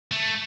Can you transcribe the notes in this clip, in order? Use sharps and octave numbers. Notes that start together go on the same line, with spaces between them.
A3